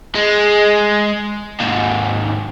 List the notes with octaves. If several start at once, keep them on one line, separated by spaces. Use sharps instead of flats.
G#3
D#2 G#2